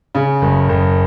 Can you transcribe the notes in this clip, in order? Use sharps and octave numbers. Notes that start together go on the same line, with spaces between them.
C#3
F#1
F#1